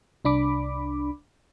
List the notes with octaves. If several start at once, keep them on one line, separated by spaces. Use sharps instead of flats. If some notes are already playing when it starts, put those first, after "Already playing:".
C2 D4 B5 D6